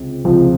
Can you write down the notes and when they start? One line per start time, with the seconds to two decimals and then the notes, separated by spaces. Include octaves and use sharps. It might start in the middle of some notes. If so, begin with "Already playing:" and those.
Already playing: C#2 C3 C4
0.25 C#2 C3 F3 C4